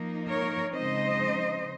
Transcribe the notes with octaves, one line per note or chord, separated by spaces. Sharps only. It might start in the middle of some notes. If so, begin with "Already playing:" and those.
Already playing: F3 A#3 D#4
A#4 C#5
C#3 F3 G#3 C4 D#4 C5 D#5